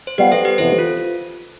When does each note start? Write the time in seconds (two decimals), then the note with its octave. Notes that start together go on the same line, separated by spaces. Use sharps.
0.07 C5
0.18 G3 B3 F4 G4 B4
0.32 A4 C5
0.45 G4 B4
0.58 F2 C3 E3 B3 E4 A4 C5
0.79 F4